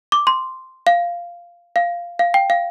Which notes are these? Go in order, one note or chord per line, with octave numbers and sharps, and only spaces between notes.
D6
C6
F5
F5
F5
G5
F5